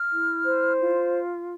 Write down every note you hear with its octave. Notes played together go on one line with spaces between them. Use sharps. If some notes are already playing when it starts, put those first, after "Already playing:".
Already playing: F6
E4
C5
F4